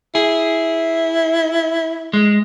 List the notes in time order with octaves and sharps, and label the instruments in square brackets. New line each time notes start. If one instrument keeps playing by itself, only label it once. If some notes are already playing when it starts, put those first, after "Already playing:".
[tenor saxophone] E4 [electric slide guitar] G#4
[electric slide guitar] G#3